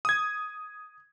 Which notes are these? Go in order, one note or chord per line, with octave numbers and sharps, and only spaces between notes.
D#6 G#6